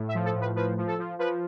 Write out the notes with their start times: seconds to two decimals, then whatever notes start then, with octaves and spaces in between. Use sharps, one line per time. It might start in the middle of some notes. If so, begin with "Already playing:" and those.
Already playing: A2
0.08 E5
0.14 F3
0.25 A4
0.35 A2
0.41 B4
0.55 F3 B4
0.78 F3
0.87 A4
0.99 F3
1.19 F3 B4